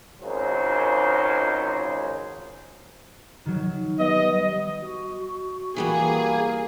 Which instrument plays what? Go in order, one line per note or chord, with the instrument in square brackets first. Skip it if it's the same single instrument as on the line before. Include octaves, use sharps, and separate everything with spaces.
[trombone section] G#1 C#2 D#3 F#3 C5
[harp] D#3 F#3
[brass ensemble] G3 B3 D#5
[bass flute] F#4
[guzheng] E3 G3 B3 [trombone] A#3 [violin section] G#4